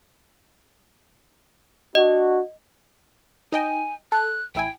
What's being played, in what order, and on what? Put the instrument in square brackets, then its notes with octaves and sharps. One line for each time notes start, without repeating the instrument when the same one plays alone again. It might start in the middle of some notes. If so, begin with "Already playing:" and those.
[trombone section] D4 F#4 [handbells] D#5
[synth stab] D#4 D#5 G5 [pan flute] G#5
[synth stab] A4 [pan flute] F#6
[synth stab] A1 E4 G#5 [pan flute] G5